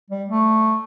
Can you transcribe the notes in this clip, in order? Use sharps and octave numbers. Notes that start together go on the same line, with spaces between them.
G3
A3